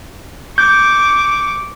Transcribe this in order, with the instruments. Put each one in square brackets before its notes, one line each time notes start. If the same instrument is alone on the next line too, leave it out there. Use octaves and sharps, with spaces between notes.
[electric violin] C#6 D6 [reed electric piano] G6